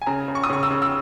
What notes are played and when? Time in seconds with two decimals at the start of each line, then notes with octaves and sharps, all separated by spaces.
0.02 G#5
0.06 C#3 A#5
0.28 C#3
0.35 C#6
0.44 D#6
0.50 C#3 C#6
0.63 E6
0.70 C#3
0.82 E6